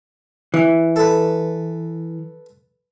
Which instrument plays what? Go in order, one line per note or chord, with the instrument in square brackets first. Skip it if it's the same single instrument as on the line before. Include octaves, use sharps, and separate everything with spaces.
[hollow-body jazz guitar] E3
[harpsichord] A4 B4